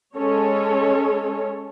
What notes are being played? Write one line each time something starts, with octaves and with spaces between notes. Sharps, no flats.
G#3 C#4 A4 C#5